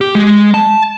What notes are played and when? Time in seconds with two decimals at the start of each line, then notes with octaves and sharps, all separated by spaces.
0.01 G4
0.15 G#3
0.54 A5